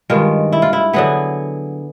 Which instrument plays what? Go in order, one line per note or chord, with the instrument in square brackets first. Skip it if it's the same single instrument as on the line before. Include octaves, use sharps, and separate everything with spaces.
[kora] G2 D#3 G#3 F4
E4
F4
E4
D3 F#3 B3 G#4